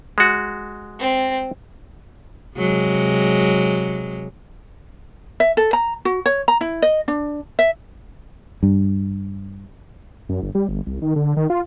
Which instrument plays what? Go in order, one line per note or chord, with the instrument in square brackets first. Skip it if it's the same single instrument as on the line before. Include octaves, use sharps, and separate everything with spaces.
[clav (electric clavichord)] G#3 F#4
[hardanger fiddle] C4
[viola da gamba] C3 F#3 G#3
[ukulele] E5
A4
A#5
F#4
C#5
A#5
E4
D#5
D4
E5
[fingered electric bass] G2
[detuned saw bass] F#2
G1
G3
G1
C2
D#3
D3
D#3
F4